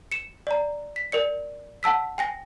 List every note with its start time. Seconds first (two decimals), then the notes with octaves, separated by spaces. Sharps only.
0.12 C#7 E7
0.47 D5 A#5
0.96 B6
1.12 A#4 D5 C#7
1.83 F#5 A5 E6 B6
2.18 G5 G#5 A#6